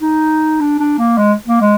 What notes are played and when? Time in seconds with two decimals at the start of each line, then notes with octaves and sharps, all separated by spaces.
0.02 D#4
0.60 D4
0.79 D4
0.98 A#3
1.18 G#3
1.47 A#3
1.61 G#3